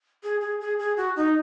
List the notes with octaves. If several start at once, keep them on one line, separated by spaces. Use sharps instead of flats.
G#4
G#4
G#4
G#4
F#4
D#4